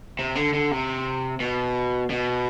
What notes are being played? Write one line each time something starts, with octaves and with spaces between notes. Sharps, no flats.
C3
D3
D3
C3
B2
B2